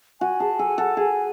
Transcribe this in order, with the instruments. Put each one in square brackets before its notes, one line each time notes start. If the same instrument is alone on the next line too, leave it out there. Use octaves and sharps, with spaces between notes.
[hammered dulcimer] F#4 [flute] G#5
[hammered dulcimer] G#4 [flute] A5
[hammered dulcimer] A4 [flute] G#5
[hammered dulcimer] A4 [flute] F#5
[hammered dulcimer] G#4 [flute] G#5